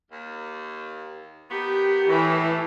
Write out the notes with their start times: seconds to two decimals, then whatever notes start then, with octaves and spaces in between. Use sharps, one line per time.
0.11 D#2
1.50 D#3 B3 G4
2.09 A2 E3